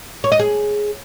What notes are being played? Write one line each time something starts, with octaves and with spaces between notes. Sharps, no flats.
C#5
D#5
G#4